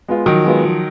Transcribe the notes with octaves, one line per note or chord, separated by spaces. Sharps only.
G#3 B3 F4
D#3 F3 F#3
G#3 B3 F4
F3